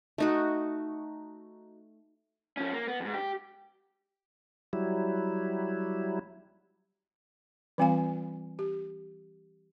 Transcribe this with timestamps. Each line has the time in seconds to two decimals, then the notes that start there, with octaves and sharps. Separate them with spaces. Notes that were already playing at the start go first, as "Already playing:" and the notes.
0.18 A3 D#4 F#4
2.57 F3 C#4
2.73 A#3
2.88 B3
3.00 F2 G#2
3.14 G4
4.73 F#3 G3 E4
7.78 E3 G3 C4 F4 F5 G#5
8.59 G4